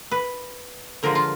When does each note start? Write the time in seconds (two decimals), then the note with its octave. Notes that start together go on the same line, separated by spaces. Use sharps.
0.11 B4
1.03 D3 F3 G#3 A#4
1.15 F4